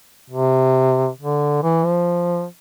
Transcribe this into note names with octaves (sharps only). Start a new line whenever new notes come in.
C3
D3
E3
F3